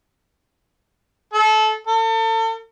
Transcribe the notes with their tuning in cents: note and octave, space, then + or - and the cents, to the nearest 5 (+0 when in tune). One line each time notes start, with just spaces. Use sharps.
A4 -25
A4 +40